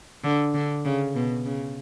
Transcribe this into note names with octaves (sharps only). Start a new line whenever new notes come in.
D3
D3
C#3
B2
C#3